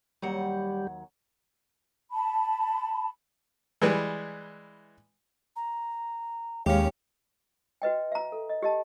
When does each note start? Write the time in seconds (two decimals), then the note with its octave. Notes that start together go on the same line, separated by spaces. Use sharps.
0.22 D#2 F#3 G3 F#5
2.12 A5 B5
3.82 E3 G3 G#3 B4
5.56 A#5
6.66 D#2 G#3 C#4 G4 C#5 F5
7.82 F#4 B4 D#5 G5
8.12 E5 A#5
8.32 A4
8.49 D#5
8.62 G4 D#5 A5